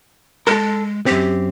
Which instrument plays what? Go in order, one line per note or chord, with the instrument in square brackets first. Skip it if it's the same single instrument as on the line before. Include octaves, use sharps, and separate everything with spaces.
[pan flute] G#3 [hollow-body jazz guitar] A4 A#4
[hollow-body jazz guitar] F#2 C4 [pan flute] G4